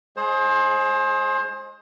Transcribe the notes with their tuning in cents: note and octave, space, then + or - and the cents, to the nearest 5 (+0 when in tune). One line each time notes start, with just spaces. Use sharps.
G#3 -5 G#4 +25 C5 +30